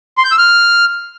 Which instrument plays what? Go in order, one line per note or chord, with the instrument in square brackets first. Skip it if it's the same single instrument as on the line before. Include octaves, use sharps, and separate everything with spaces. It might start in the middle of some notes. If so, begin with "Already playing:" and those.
[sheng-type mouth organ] C6
G6
E6
F6